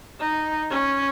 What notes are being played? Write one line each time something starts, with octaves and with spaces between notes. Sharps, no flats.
D#4
C#4